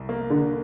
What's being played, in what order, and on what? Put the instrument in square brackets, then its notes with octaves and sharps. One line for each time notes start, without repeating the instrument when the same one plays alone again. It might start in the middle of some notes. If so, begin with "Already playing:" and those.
Already playing: [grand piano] C2
A#3
[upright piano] D3